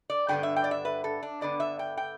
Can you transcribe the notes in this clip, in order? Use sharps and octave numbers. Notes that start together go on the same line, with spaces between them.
D5
G2 D3 B3 G5
E5
G5
D5
E5
B4
A4
D4
G2 D3 B3 D5
E5
G5
G5